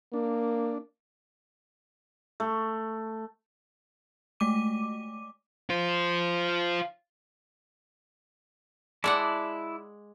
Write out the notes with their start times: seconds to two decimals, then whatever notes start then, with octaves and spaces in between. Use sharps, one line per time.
0.14 A#3 D4
2.40 A3
4.40 G#3 A3 D6 D#7
5.70 F4 C5
9.04 G#3 E4 D5 F#5 A5 D6